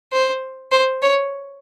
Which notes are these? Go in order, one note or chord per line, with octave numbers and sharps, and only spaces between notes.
C5
C5
C#5